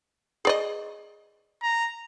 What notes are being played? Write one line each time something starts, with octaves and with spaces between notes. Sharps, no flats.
G#4 D5 D#5
A#5